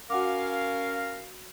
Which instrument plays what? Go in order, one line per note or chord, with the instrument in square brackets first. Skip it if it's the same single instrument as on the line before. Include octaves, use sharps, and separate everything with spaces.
[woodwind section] C#4 A#4 F5 [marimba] F#4 F#5 D6